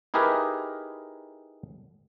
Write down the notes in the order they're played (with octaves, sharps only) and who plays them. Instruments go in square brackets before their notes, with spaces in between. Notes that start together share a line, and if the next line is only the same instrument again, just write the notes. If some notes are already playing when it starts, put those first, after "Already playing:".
[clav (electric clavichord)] D#4 E4 G4 G#4 A#4 B4